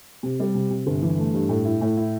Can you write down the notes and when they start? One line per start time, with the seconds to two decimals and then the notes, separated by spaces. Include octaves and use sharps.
0.23 C3
0.40 G3
0.55 C3
0.70 C3
0.87 G1
1.02 E3
1.18 A3
1.34 G2
1.49 A2
1.65 E4
1.81 A2
1.97 E4